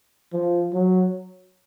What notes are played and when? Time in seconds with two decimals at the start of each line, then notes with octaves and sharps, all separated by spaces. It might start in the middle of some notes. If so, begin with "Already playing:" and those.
0.33 F3
0.73 F#3